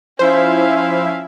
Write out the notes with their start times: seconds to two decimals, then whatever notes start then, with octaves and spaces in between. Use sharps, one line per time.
0.19 F3 C#4 E4 C5 E5 F5